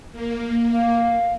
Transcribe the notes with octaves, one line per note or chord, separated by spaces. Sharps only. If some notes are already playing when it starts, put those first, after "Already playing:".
A#3
F5